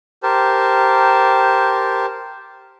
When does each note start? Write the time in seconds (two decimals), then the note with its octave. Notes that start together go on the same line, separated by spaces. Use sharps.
0.23 G4 A#4 C5 A5